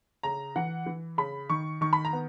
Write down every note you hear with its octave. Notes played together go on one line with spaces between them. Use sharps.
C#3 A#5
E3 F#5
E3
C#3 B5
D#3 C#6
D#3 C#6
B5
A#5
B3